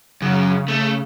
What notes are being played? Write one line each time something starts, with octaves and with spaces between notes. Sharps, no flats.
F#2 C#3
A3